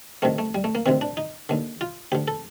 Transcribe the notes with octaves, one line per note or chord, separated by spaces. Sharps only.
D2 C3 D#3 A3
A3
G3
A3
A#3
D2 C3 D#3 C4
D4
D#4
D#2 D3
F4
D2 D3 G4
A4